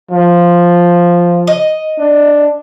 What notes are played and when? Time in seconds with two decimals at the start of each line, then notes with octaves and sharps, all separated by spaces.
0.11 F3
1.47 D#5
1.98 D4